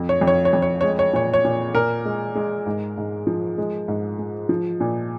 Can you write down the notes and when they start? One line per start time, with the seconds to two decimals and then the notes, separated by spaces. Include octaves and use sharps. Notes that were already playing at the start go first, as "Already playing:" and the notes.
Already playing: F2
0.09 C#5
0.21 F2
0.27 C#5
0.45 C#5
0.53 F2
0.62 C#5
0.81 G#3 C#5
0.99 C#5
1.13 A#2 C#5
1.34 C#5
1.44 A#2
1.74 A#2 A#4
2.05 G#3
2.35 G#3
2.66 G#2
2.97 G#2
3.27 F3
3.58 G#3
3.88 G#2
4.19 G#3
4.49 F3
4.80 A#2